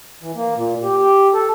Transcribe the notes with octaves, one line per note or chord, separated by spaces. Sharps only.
E3
A#3
A#2
G4
G4
A4